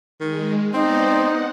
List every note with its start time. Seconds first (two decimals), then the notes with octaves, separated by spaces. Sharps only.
0.20 D#3 G#3
0.74 B3 C4 D#4 C5 D5
1.10 F#5